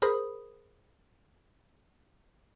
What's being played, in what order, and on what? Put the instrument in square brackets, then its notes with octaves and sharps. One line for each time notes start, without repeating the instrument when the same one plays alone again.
[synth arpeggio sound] G#4 A#4 C5 B5 D#6